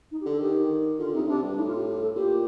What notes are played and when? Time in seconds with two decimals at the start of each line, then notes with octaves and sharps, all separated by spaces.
0.11 D#4
0.21 G4
0.26 D3
0.31 A4
0.40 D#3 G4
0.99 D3 F4
1.14 C3 D#4
1.23 D3
1.28 C3 D4
1.42 G2
1.57 A2 D#4
1.67 F4
1.76 G4
1.87 G4
2.02 A4
2.16 A#2 G4